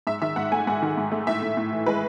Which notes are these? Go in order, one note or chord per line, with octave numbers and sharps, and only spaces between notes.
G#2 E5
D#3 E5
G#2 F#5
A3 G#5
G#2 F#5
D#3
G#2
A3
A2 E5
A2
A2
E3
G#3 B4